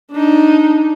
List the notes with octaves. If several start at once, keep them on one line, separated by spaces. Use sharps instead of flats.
D4 D#4